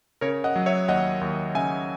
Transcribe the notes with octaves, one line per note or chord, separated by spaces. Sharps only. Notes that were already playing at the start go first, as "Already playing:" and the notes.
C#3 A#4 C#5
D#5 F#5
F#3
C#5 E5
D#2 D#5 F#5
D#2
C#3 E5 G#5